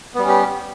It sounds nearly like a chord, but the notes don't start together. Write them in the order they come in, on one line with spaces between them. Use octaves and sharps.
B3 G3 C#4 G4